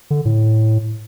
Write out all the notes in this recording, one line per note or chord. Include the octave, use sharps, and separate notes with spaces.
D3
A2